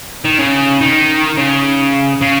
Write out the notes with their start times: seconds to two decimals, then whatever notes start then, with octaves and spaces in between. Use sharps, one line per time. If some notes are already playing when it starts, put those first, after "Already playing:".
0.25 D#3
0.39 C#3
0.81 D#3
1.37 C#3
2.22 C#3